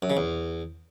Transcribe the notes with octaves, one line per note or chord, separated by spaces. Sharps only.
F#2
C#3
E2